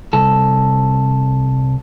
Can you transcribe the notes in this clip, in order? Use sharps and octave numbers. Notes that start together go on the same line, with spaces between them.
C2 A4